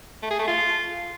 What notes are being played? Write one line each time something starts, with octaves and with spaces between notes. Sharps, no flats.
A3
G#4
A3
F4